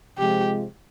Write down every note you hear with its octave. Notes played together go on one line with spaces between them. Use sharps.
C3 F3 G#3 G4